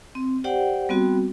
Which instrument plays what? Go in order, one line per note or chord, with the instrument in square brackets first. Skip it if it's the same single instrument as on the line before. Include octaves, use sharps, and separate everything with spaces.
[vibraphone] C4
G4 C5 D5 F#5 G5
G3 B3 C4 F#4